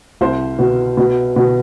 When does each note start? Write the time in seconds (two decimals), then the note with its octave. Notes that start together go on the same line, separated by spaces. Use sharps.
0.21 C2 C5
0.59 B2
0.97 B2
1.36 B2